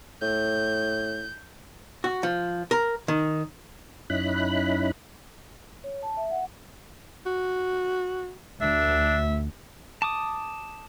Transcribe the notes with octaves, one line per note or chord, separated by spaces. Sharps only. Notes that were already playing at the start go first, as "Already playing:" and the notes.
A2 G6
F#4
F3
A#4
D#3
F#2 C#4 D#4 E4 B5 F#6
C#5
A5
E5
F#5
F#4
D2 D4 E5
A5 D6 D#6